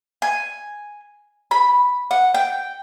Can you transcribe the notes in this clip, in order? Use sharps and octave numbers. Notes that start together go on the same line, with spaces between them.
G#5
B5
F#5
G5